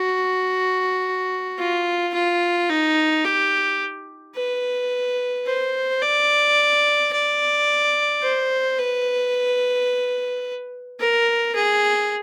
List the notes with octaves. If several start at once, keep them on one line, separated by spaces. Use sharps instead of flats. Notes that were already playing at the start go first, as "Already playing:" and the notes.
Already playing: F#4
F4
F4
D#4
G4
B4
C5
D5
D5
C5
B4
A#4
G#4